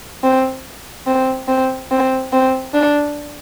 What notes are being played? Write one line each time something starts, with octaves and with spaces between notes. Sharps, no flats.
C4
C4
C4
C4
C4
D4